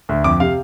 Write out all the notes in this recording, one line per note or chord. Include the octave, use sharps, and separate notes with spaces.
D2
F2 D6
C3 F5